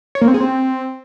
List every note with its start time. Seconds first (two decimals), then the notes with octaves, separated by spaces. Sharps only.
0.15 C#5
0.21 A#3
0.28 C4
0.34 G#4
0.40 C4